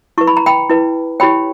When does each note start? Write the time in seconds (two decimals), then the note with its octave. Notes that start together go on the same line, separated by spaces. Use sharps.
0.18 E4 B4 C#6
0.27 B5
0.37 A#5
0.46 G5 B5
0.70 E4 B4
1.20 E4 G4 C#5 G5 B5